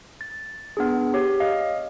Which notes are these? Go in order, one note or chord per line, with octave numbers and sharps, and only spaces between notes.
A6
B3 D4 G#4
G4 C#5
D#5 F5